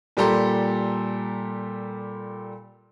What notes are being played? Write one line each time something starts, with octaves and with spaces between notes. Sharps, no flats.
A#2 G3 G4 A4 A#5 C6